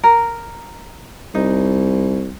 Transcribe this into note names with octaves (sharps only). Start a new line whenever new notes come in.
A#4
C2 D#4